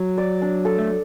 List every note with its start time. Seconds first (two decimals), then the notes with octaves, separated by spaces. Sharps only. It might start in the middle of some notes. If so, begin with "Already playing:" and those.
Already playing: F#3
0.18 D5
0.42 D4
0.65 A4
0.78 A3